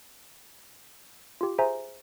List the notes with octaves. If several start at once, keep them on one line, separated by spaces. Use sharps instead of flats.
F4 G4
G#4 C5 E5 G#5 A#5